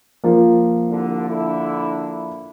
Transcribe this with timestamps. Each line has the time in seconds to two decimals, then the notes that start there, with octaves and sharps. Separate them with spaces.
0.24 F3 A#3
0.88 C2 D3
1.29 D3 E4